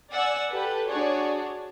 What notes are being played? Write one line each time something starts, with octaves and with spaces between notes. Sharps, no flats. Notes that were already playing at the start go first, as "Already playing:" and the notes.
D5 F#5 G#5 E6
G4 A4 B4
D4 F#4 G#4 C#5 D5